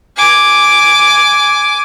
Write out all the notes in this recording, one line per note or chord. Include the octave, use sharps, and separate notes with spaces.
G#5 D6